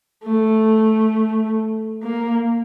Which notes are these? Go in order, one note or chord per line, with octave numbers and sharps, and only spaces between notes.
A3
A#3